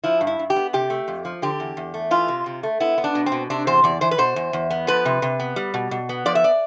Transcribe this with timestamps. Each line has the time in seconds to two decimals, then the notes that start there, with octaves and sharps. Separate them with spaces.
0.04 F3 E4
0.21 G2
0.27 E4
0.39 G2
0.50 G4
0.56 B3
0.73 C3 G4
0.90 A3
1.08 F2
1.25 F3
1.42 D3 G4
1.60 E2
1.77 E2
1.94 A3
2.11 E3 F4
2.28 C3
2.46 C3
2.63 A3
2.80 B3 E4
2.98 B3
3.04 D4
3.15 B2
3.26 C4
3.32 B2
3.50 C3 D4
3.67 E2 C5
3.84 E2 D5
4.01 E3 C5
4.11 B4
4.18 B2 C5
4.36 E2
4.53 E2
4.70 B3
4.87 F3 B4
5.05 C3
5.22 C3
5.40 B3
5.56 G3
5.74 B2
5.91 B2
6.09 B3
6.25 F3 D5
6.35 E5
6.44 D5